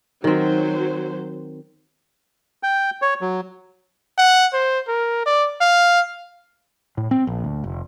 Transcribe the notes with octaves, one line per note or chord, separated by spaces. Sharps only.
D#3 F#3 C4 C5
G5
C#5
F#3
F#5
C5
A#4
D5
F5
A2
C4
A#1
D2
F1